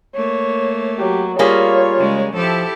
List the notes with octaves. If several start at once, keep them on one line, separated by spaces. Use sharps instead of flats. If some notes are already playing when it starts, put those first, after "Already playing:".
A3 A#3 C#5
F#3 G4
G3 A#3 F4 G#4 C#5
C#3 G#3
F3 E4 G4 A4